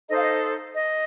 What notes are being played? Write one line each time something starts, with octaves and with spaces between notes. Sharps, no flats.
D#4 A4 C5 D#5
F5
D#5
D#5